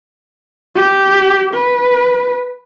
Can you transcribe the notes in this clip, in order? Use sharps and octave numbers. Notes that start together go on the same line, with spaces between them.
G4
B4